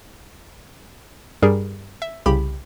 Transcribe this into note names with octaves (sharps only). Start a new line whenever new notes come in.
G2 G3 G#4 A#4
E5
C2 C#3 G4 B5